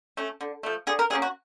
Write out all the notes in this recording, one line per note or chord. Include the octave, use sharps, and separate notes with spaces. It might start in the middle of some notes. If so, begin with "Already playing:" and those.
A3 C#4
D3
F3 A3
D3 G#4
A#4
F#3 A#3 C#4 G#4
F#4